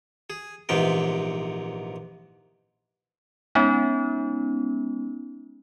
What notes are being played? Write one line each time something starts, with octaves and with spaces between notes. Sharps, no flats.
G#4
A#1 G#2 C3 E3 B3 G5
G#3 B3 C#4 D#4